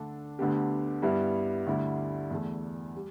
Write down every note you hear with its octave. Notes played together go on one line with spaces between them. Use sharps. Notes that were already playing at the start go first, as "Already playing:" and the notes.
Already playing: D2 D3 A3 D4 A4
D2 D3 B3 D4 G4
G2 G3 B3 E4
D2 D3 G3 E4
E2 E3 A3
G3